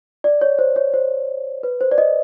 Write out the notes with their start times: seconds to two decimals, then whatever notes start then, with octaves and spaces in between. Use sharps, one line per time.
0.24 D5
0.41 C#5
0.59 C5
0.76 C#5
0.94 C5
1.63 B4
1.81 C5
1.91 D5
1.98 D#5